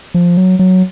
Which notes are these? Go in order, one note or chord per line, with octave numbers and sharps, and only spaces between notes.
F3
F#3
F#3